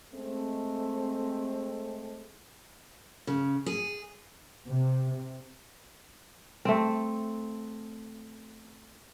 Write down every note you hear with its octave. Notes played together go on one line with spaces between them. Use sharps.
G#3 A3 C4
C#3
G#4
C3
A3 C4